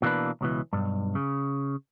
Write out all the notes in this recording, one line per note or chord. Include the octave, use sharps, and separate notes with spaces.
B2 E3 A#3 D4 B4
C#2 B2 E3
B1 G2
C#3